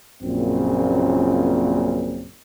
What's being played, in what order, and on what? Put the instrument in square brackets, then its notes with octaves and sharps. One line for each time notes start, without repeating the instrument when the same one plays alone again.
[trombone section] A#1 F#2 A#2 C#3 C4